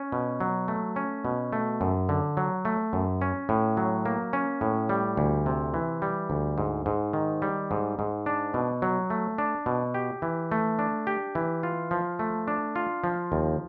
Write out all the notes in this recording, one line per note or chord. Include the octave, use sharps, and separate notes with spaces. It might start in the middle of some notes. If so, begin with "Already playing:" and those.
Already playing: C#4
B2
F#3
A3
C#4
B2
A3
F#2
D3
F#3
A3
F#2
C#4
A2
F#3
A#3
C#4
A2
G3
D2
C3
E3
G3
D2
G#2
G#2
D#3
G3
G#2
G#2
D4
B2
F#3
A3
D4
B2
G4
E3
A3
D4
G4
E3
F4
F3
A3
D4
F4
F3
D#2